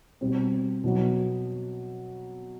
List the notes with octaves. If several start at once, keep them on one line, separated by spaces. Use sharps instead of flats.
B2 G3 C4
B2 F#3 B3